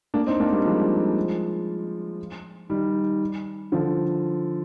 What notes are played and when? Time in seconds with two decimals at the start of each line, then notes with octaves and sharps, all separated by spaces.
0.14 A#3 D4
0.27 C4 D#4
0.40 A#3 D4
0.52 G3 A#3
0.65 F3 G#3
2.70 D#3 G3
3.72 D3 F3